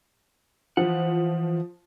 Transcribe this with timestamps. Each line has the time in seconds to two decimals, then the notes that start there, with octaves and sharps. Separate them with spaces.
0.77 E3 F3 F#5